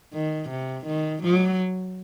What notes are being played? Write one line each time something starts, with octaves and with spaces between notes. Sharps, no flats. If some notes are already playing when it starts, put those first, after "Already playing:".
D#3
C3
D#3
F#3